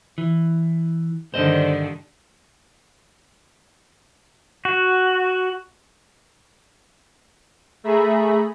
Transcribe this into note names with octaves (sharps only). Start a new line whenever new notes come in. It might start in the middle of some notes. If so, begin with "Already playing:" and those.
E3
G2 D3 D#3 C5 D#5
F#4
A3 G#4 E5 A#5 B5